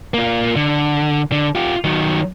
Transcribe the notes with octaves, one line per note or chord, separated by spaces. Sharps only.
A#3 F4
D3
D3
F4 G4
D#3 F#3